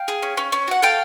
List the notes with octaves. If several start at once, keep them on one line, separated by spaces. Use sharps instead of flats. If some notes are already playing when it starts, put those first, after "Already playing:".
Already playing: F5 G5
G#4
C#4
C#4
C#4
F#4 F#5
A4 F5 G5